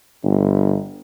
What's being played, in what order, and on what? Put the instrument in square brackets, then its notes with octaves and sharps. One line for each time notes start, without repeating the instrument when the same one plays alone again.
[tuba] G1